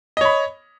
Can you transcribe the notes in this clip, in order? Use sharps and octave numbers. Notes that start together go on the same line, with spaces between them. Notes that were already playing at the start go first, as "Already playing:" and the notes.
C#5 D#5 B5